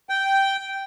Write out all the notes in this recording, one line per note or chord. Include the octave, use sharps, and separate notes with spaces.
G5